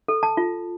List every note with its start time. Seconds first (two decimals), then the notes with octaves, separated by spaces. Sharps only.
0.08 A4
0.23 A5
0.37 F4